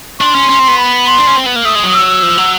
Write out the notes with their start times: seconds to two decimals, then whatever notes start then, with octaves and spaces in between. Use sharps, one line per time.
0.21 D4 C6
0.35 C#4
0.49 C#4
0.59 C4
0.68 B3
0.78 B5
1.07 C6
1.18 D4
1.27 C#4
1.36 C4
1.46 B3
1.56 A#3
1.65 A3 D#6
1.75 G#3
1.84 F#3
1.94 E6
2.23 F3
2.38 F#3